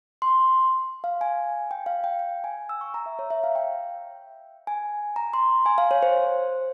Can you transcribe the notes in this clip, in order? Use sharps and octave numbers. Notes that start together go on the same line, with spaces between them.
C6
F5
G#5
G5
F5
G5
G5
G#5
E6
C#6
A#5
E5
C#5
E5
F5
G5
G#5
A#5
C6
G#5
F5
C#5
C5